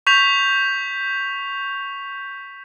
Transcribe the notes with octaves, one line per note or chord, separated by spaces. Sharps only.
C#6 G6 B6 F7